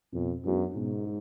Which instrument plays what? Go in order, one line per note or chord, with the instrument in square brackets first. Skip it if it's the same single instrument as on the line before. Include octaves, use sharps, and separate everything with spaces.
[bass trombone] F2 [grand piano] B2
[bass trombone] F#2 [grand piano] G#3 B3 D4 F#4
[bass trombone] G#2 [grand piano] B2
[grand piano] G#3